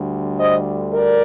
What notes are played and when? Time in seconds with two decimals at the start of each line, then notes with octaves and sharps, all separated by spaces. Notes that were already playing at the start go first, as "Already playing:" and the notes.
Already playing: D2 D3 G3
0.39 C5 D#5
0.93 A#4 D5